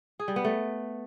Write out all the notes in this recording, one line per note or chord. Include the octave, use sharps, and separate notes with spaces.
G#4
G3
B3
A3